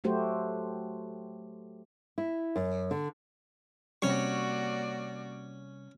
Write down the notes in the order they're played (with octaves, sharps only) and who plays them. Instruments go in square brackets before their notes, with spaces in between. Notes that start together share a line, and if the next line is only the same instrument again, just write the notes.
[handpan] F#3 A3 F#4 G4 C5
[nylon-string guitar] E4
F#2
D3
[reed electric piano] C3 G3 [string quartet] A#3 F#4 D5 [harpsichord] C#4 C#6